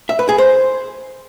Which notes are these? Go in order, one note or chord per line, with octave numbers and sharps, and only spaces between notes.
E5
B4
G#4
C5